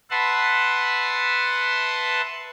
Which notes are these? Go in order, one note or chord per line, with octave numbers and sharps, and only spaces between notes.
B4 E5 F#5 A5 C6